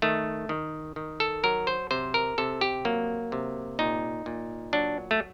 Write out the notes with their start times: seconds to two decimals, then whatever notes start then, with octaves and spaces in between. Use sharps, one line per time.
0.02 D#3 A3
0.49 D#3
0.96 D#3
1.20 A4
1.43 F#3 A#4
1.67 C5
1.91 C3 C5
2.14 A#4
2.38 C3 A4
2.61 G4
2.85 F#3 A#3
3.32 C3
3.79 A#2 D#4
4.26 A#2
4.73 F#3 D4
5.11 A3